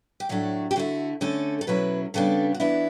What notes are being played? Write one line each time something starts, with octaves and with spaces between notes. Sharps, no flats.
G4
A2 F#3 A3 D4 F#4
G4
D3 A3 E4 F#4
D3 A3 C#4 A4
A4
B2 F#3 C#4 E4 B4
C#3 G3 B3 D4 A4
F#4
E3 B3 D4 E4